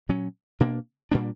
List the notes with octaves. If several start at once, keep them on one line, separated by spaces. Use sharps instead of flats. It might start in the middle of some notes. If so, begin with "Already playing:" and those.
A#2 F#3 C#4
B2 A#3 D4
A#2 G3 A#3 D4